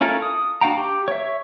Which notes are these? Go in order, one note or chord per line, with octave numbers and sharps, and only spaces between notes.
C#4 E4 F4 A4 A#4
D#6
D4 F#4 F5 G5 A#5
G4
C#5 E5